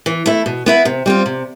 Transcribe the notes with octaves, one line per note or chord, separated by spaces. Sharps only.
E3
A3 E4
B2
B3 E4 B4
C3
G3 C4 F4
C3